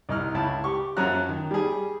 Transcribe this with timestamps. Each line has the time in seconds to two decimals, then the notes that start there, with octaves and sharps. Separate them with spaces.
0.09 C2 D#4 F6
0.34 C#2 E4 A5
0.64 G4 C#6
0.97 F#2 F3 C#4 F#4 A#5 F#6
1.29 D#3
1.51 G3 G#4